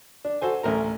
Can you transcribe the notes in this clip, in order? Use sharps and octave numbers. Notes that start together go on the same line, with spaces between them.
D4
F#4 A4 C5 G#5
A1 D2 A#4 A#5